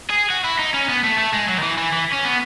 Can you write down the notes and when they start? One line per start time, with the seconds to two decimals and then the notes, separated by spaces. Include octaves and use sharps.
0.10 G#4
0.30 F#4
0.44 E4
0.59 D#4
0.74 C#4
0.89 B3
1.04 A3
1.18 A3
1.33 G#3
1.48 F#3
1.58 D#3
1.63 E3
1.78 E3
1.93 E3
2.13 C#4
2.25 B3